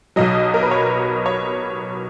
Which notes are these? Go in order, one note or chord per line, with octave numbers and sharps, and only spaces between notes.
B1 B2 F#3 D#5
A#4
B4
C#5
C#5